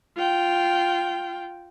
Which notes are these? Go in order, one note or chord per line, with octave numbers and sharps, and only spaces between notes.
F4 G5